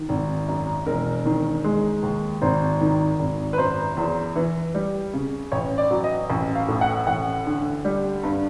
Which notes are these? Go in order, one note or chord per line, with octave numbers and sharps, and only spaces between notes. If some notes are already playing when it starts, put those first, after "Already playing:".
Already playing: D#3
G#1
F#2
E1 A#4
D#3
G#3
D#2
G#1 C5
D#3
G#1
B4
F#2 C5
E2
E3
G3
C#3
A1 C#5
D5
F#3
D#5
A1
F5
A2
F#5
A1 F#5
D3
G3
G2